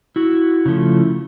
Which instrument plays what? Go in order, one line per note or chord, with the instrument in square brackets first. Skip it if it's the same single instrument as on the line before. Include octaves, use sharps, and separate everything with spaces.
[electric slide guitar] E4 F#4
C#3 F3 A3